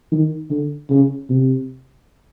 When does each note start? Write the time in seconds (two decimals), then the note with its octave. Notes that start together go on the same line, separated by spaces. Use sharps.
0.11 D#3
0.50 D3
0.90 C#3
1.29 C3